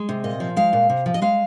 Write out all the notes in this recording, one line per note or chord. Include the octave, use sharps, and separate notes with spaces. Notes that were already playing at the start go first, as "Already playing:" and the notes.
Already playing: G#3
C3
A#2 D#5
F3
G#3 F5
A#2
C3
F3
D#5
G#3 F5